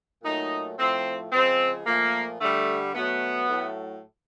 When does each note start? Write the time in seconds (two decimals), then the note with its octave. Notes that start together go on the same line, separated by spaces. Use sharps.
0.24 A#2 F#3 A3 D#4
0.78 A2 F3 A3 C4
1.32 C#3 F3 G#3 C4
1.86 A#2 F3 A3 A#3
2.40 D3 G3 A3
2.94 B2 F#3 A3 B3
3.47 A2 F#3 A3